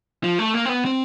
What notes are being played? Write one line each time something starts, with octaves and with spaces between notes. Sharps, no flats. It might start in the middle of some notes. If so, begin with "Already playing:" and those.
F3
A3
A#3
C4
B3
C4